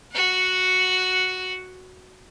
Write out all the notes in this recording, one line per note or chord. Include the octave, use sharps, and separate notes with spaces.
F#4 F#5